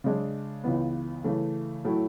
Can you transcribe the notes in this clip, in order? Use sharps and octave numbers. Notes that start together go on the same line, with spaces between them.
C#3 G#3 D4
C#2 C#3 E3 B3
C#3 E3 A3
A2 F#3 A3 E4